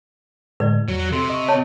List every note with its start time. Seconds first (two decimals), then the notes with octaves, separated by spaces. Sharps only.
0.60 A2 D3 G#3 B4 D5
0.89 E2 F#3
1.12 C3 A4 C6
1.30 D#5 C#6
1.48 C#5 A5